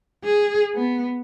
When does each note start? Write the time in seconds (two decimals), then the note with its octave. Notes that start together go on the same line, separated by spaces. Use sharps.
0.24 G#4
0.75 B3